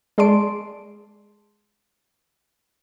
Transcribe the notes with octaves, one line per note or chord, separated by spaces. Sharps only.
G#3 G#4 D5 A5 C6 D7